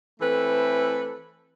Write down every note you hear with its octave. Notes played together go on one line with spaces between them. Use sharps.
E3 A3 C4 A4 B4